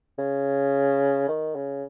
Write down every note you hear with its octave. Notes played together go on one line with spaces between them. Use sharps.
C#3
D#3
C#3